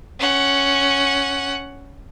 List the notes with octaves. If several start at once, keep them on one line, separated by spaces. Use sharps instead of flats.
C#4 F#5